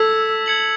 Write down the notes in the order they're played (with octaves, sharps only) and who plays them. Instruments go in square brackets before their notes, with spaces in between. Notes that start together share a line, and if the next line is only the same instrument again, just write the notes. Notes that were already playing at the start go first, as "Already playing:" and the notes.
Already playing: [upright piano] A4 [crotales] E6 G#6 B6 E7
[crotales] G#6 C#7 F#7